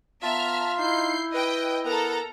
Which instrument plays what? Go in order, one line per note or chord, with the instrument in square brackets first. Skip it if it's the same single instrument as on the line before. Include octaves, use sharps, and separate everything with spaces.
[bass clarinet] B3 [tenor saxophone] F4 [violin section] E5 A#5 F6 [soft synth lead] A5
[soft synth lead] D#4 [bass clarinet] E4 [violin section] G6 C7
[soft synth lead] B4 [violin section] D#5 G5
[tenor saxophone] B3 [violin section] A4 A#5 [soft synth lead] A#4